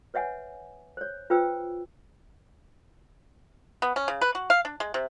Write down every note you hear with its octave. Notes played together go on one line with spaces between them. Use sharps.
B4 C#5 E5 F#5 G#5
C5 C#5
F4 B4 C5 G5 E6
B3
C#4
C#3
B4
F#4
F5
D4
G#3
C3